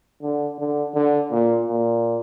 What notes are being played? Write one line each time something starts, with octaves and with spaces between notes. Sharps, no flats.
D3
D3
D3
A#2
A#2